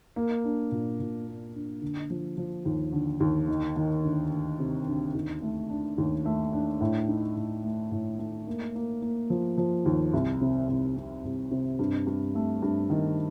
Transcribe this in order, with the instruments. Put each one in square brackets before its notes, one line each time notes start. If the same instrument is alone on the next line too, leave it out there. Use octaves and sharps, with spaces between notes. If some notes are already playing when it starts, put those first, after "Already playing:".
[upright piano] A#3
D4
A#2
A#2
A#3
D4
D3
F3
F3
D#2
D3
D#2
D#3
D#3
D2
D2
C3
D2
D#2
A3
D4
D#2
A3
D4
A2
D#4
A2
A3
A2
A3
A#3
A#3
A#3
F3
F3
D#2
C2
C3
C2
C3
C2
C3
G2
G2
A3
G2
D#3